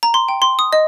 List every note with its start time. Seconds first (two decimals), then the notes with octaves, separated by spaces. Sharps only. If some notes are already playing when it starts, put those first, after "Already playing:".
0.03 A#5
0.14 C6
0.28 G5
0.42 C6
0.59 D#6
0.73 D#5